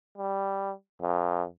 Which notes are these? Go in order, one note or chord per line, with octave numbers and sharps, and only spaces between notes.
G3
F2